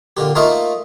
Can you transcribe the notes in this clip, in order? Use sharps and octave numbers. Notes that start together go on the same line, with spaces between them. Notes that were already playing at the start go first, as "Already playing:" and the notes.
A#2 D3 G4
A3 A#3 D#4 F4 D#5 E5